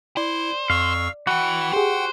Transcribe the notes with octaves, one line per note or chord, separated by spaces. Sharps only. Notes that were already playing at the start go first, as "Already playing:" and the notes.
E4 C5 D5
F2 F5 C#6 E6
E3 F#4 F#5 G5
G4 G#4 C5